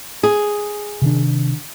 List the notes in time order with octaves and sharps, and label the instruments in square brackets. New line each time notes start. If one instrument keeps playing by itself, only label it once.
[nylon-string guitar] G#4
[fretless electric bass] C3 D#3 D4